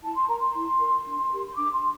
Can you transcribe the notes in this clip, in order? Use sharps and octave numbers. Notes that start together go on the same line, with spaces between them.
E4 A5
C6
A#4 A#5
C6
E4
A#4
D4
G4 A#4
C6
D4 D6
C6